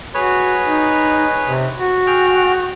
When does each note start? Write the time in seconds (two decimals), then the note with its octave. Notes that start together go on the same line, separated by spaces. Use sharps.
0.14 F#4 G#4 B4 C#5
0.66 D#4
1.47 C3
1.77 F#4
2.07 G#4 G5 F6